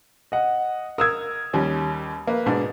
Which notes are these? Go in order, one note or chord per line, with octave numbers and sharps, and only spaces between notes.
D#5 F#5
A#4 D#6 E6 G#6
D#2 G3 C#4
A#3 B4
G#2 B2 D4